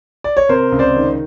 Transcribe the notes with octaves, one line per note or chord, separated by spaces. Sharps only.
D5
C#5
C3 A#4 C5
C#2
C5 D5
D#3